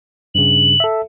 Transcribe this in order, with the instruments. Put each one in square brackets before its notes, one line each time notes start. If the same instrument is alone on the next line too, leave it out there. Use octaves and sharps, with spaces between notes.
[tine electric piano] G2 C#3 [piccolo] F#7
[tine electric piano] A4 E5